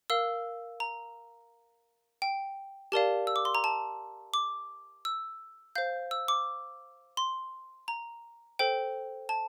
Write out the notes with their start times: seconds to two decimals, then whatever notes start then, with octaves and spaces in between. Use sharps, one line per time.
0.10 A#4 F5 E6
0.80 A#5
2.22 G5
2.92 G4 A#4 D5 F5 A5
3.27 E6
3.36 D6
3.45 C6
3.55 A#5
3.64 A5
4.34 D6
5.05 E6
5.75 C5 F5 G6
6.11 E6
6.28 D6
7.17 C6
7.88 A#5
8.59 A4 C5 G5
9.29 A5